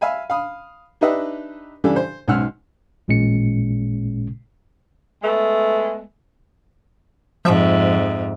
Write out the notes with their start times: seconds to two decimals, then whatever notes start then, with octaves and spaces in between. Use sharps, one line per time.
0.01 E5 F5 G#5 B5
0.30 F5 B5 D#6
1.01 D4 D#4 G4 B4 D#5 E5
1.84 C#3 E3 G3 D4 A4
1.96 C5
2.28 B1 G#2 C#4 F#5 E6 F6
3.08 A1 A#2 G#3 C#4 C#7
5.22 G#3 A3 B3
7.45 F2 G#2 F3 E5